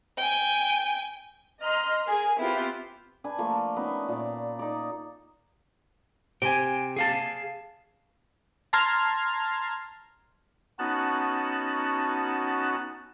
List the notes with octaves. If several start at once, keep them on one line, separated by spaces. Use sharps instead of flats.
G5 G#5
D#5 A#5 C6 F6
G#4 A#4
B3 C4 E4 F4 G4 B4
D4 B4 G#5
F3 A3 A#3
B3 C#4 D#4
A#2 D5
D#4 D5
C3 G5 G#5
G#4 F5 A5
A5 A#5 C6 F6 G#6
B3 C#4 D#4 F#4 A5 F#6